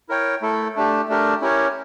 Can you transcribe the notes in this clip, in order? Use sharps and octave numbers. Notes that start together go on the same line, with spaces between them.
E4 A#4 C#5 G5
A3 E4 A4
A3 D4 G4
A3 D4 G4 A#4
C#4 E4 G4 A#4 C#5